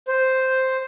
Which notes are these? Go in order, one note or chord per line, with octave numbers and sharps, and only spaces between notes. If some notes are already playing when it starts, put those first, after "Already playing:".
C5